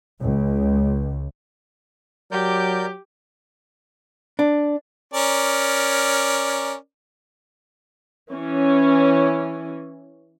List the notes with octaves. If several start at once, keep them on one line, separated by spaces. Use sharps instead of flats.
C#2
F#3 G4 A#4 D5 G6
D4
C#4 A#4 D5
E3 C#4